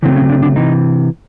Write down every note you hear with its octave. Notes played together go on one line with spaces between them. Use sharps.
C#3 E3 F#3 A3 C4 E4
C#4
D3 D4
D3 D4
C3 E3 D#4